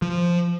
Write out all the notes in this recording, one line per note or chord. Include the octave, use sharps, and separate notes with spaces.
F3